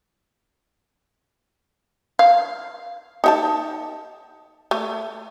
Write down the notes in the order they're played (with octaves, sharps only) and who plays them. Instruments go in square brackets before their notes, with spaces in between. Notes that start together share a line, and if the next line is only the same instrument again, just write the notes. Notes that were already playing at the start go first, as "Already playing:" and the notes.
[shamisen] F5
D#4 E5 A5
A3